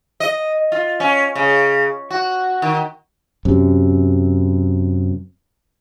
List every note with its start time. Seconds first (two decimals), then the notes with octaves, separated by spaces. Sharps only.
0.20 D#5
0.72 F4
1.00 C#4
1.36 C#3
2.10 F#4
2.62 D#3
3.45 F#2 C3